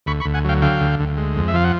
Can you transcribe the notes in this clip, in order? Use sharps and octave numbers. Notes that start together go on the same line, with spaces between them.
D2 B5 C#6
B5 C#6
D2
F#5 G#5
F#3 F5 G5
D3 F5 G5
D2
D2
G#3
F2
E5
F3 F5
F#5